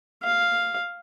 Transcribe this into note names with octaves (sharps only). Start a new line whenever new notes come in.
F5